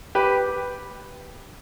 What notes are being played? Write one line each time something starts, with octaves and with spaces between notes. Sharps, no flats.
G4 B4